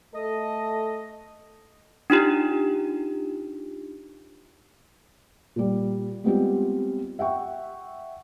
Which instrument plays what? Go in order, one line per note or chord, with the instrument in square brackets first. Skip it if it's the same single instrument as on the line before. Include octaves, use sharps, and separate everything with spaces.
[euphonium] A3 [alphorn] A4 [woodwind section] D#5
[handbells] D4 D#4 F4 G4
[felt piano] A#2 G3
G3 G#3 B3 C4 F4 G4
E5 F#5 G5 C#6